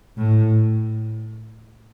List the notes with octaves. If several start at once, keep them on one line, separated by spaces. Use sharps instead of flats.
A2